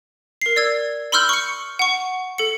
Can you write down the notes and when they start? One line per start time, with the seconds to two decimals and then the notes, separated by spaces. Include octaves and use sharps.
0.41 A#4 C7
0.56 D5 E6 G#6
1.12 B5 C6 E6 F6 G6
1.29 C#6 C#7
1.79 F#5 C#6
2.38 A4 C#7